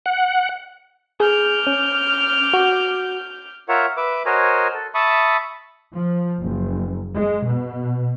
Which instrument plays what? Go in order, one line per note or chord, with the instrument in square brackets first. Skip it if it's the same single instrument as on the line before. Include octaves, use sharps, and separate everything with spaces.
[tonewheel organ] F#5
[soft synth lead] G#4 [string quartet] D6 F6 G6
[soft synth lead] C#4
F#4
[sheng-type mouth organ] F4 A#4 C#5 E5 F#5
B4 E5 D6
F#4 A#4 C5 C#5 D#5 G#5
A4
E5 A5 B5 C#6 D#6
[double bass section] F3
F#1
G#3
B2